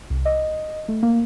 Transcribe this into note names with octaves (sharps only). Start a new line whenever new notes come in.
C2
D#5
A3
A#3